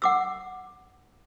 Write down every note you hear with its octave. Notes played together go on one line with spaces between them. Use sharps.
F#5 D6 E6